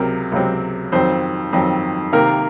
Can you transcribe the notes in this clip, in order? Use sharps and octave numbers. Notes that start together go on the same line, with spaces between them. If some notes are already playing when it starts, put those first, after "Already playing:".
Already playing: C#2 C3 F#3 C4 A#4
C#2 C3 F#3 C4
F2 D#3 F#3 C4 C5
F2 D#3 F#3 C4
C3 D#3 A#3 A#4